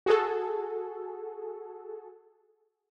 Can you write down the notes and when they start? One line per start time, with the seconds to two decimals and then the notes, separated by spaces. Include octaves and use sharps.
0.06 F#4 G#4 A4